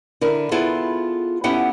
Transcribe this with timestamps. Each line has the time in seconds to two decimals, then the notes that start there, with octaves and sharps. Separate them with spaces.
0.21 D3 E4 A#4
0.51 B3 E4 F4 G#4 A4
1.44 B3 C#4 E4 G4 A4 F#5